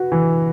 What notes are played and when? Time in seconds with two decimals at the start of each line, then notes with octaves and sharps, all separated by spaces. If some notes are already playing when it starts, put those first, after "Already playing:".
Already playing: F#4 B4
0.12 E3